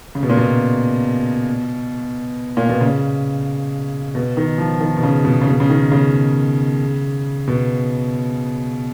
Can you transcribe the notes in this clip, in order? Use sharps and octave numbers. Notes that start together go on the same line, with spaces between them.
C#3
B2
A#2
B2
A#2
B2
C#3
B2
D#3
F3
D#3
B2
C#3
B2
C#3
B2
C#3
D#3
C#3
B2